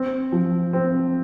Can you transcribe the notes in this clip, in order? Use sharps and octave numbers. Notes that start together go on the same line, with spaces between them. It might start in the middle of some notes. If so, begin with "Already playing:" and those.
Already playing: C4
F3
C4